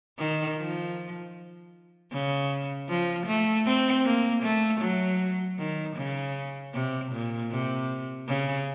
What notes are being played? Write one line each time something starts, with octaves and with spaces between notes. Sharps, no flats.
D#3
F3
C#3
F3
A3
C4
A#3
A3
F#3
D#3
C#3
C3
A#2
C3
C#3